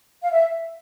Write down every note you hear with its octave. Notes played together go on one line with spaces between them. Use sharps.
F5
E5